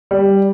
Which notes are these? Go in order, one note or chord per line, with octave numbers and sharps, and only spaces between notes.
G3